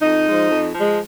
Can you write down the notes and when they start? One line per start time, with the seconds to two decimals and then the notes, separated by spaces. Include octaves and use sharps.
0.01 F2 D#4
0.26 F3 G#3
0.50 F2
0.74 F3 G#3